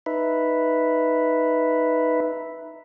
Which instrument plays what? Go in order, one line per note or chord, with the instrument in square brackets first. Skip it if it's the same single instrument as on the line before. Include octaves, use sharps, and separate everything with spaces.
[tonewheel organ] D#4 B4 E5